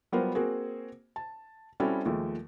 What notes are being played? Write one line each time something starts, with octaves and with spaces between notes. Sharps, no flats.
F#3 G3 B3 F4 A#4 C5
A#3 C4 F#4 G#4
A5
G3 C4 C#4 E4 F#4 A4
D#2 F3 G#3 A3